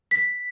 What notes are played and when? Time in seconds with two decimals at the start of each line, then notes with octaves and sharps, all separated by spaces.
0.11 B6